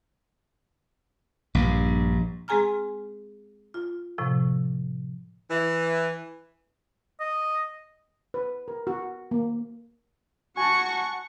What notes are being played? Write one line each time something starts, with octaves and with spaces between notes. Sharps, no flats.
A#1 G2
G#3 C4 G#4 G#5 A#5 F6
F4
A2 C3 F3
E3
D#5
B4
A#4
F#4
A#3
F#4 F#5 G#5 A5 C#6